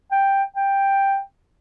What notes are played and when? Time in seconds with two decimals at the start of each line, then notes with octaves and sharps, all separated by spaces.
0.12 G5
0.56 G5